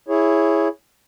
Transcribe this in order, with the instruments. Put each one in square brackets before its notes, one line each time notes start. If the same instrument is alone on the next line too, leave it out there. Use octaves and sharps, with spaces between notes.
[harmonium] E4 G#4 C#5